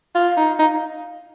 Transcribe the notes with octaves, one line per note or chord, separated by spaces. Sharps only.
F4 F5
D#4
D#4